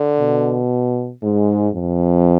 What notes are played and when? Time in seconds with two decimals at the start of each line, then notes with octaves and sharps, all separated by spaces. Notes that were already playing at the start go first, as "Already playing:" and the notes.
Already playing: D3
0.20 B2
1.23 G#2 G#3
1.74 F2